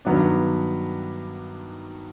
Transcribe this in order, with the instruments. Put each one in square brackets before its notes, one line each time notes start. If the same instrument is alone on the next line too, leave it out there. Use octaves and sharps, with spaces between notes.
[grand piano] G2 D#3 F#3 B3 D4